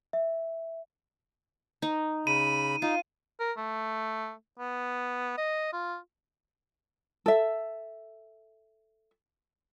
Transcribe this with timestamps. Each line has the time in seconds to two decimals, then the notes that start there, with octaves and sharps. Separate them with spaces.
0.13 E5
1.82 D#4
2.27 C#3 B5 D#7
2.82 D#4 F4
3.40 A#4
3.57 A3
4.59 B3
5.38 D#5
5.73 F4
7.26 A4 E5